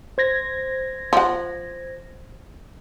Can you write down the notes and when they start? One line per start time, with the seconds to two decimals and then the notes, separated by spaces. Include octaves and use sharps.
0.18 C5 G#6 A#6
1.13 F3 F#5